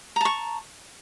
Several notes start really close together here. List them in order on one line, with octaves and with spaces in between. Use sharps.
A#5 A5 C#6